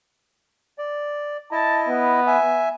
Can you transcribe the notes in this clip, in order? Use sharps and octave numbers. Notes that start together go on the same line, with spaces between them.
D5
E4 D#5 A5
B3
E5 G#5